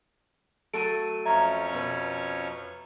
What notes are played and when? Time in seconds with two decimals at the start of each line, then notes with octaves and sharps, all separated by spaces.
0.74 F#3 A3 A4 D7 D#7
1.25 F2 C#4 E5 A#5 G#6
1.73 B2 B4